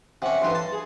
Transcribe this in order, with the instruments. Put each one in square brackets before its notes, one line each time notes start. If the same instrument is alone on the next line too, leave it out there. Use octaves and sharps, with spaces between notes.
[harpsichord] C3 C#4 [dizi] F#5
[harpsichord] A1 G2 B4 [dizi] C6
[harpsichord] A5
[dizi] G#4